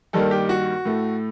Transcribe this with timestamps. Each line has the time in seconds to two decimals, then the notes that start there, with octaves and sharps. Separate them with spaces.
0.13 G2 D#3 G3 A#3 A4
0.31 G4
0.49 F#4
0.85 A2 A3